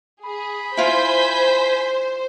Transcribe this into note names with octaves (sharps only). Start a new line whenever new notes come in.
G#4 B5
E4 F4 C5 G#5 G6 B6